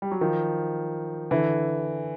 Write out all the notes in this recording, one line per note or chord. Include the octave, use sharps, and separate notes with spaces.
G3
F#3
D#3 F3
D3 E3